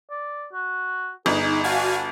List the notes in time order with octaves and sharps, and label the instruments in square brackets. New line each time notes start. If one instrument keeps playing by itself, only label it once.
[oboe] D5
F#4
[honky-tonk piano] G1 [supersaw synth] D#4 [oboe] G#4
[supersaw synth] F#4 F5 G#5 [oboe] A5